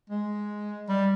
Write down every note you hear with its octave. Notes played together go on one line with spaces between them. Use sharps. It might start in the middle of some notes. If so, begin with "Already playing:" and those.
G#3
G3